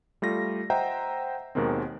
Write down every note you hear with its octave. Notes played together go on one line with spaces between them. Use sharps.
G3 A3 F4 A#6
C5 D#5 E5 F#5 G5 A#5
D#2 B2 D#3 G#3 A#3 C4